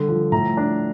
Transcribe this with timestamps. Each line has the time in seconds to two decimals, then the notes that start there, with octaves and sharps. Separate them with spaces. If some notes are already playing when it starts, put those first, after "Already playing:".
Already playing: D3 G3
0.09 F3
0.32 A2 A#5
0.57 D4